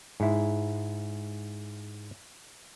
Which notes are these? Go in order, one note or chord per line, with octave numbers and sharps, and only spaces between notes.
G#2 E4